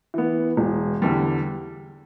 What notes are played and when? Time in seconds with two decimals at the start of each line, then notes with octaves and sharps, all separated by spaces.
0.14 E3 B3
0.57 E1
1.02 E2 D3 G3